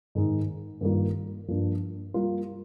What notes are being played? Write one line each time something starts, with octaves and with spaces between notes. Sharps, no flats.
G#2 D#3 G#3 D#4
G2 D#3 G3 A#3 F4
G2 F3 A#3 D4
G3 A#3 F4 A#4